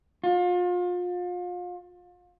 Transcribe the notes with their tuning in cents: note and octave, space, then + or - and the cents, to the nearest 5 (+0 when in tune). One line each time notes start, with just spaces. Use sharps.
F4 +35